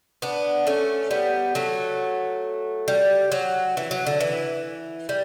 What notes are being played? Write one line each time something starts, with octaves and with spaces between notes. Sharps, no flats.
B3 D4
A3 C#4
G3 B3
F#3 A3
G3
F#3
E3
F#3
D3
E3
G3